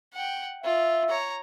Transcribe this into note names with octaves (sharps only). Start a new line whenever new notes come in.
F#5 G5
F4 E5
C#5 A#5